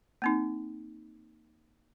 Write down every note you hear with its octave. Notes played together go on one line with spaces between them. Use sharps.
A#3 C4 D#4